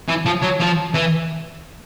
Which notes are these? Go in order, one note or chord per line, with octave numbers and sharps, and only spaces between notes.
E3
F3
F#3
F3
E3